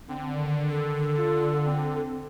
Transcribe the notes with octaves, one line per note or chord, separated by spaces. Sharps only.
D3 C4
D#3
A4
F4
C4